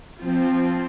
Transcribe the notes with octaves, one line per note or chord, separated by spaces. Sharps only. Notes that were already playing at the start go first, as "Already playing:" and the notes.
F3 C4 F4